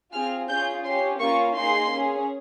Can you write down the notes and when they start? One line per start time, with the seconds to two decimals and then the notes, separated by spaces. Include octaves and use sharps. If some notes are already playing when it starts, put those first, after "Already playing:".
0.12 C4 F4 G#4 F6
0.48 C#4 F4 G#4 G6
0.84 C#4 G4 C6
1.20 A#3 C#4 F4 C#6
1.56 A#3 D#4 G#4 C6
1.91 C#4 G#4